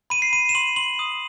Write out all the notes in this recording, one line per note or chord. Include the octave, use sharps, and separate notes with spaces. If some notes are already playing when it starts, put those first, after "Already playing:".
B5 D#7
C7
B5 D#7
E7
C6 F#7
C6 F#7
D#6